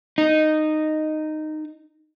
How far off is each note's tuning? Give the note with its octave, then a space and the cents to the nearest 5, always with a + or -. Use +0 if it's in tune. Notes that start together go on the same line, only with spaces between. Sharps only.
D#4 -10